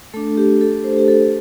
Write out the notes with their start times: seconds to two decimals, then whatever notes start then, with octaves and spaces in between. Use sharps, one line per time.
0.14 A3 D4 A4
0.37 G4
0.61 A4
0.84 C5
0.98 G4
1.08 A4